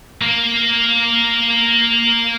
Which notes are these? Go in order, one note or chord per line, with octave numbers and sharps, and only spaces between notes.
A#3